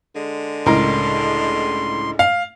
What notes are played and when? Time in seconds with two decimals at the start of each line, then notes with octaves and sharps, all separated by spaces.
0.15 D3 G#3
0.66 C#2 A2 A#4 C6
2.19 F5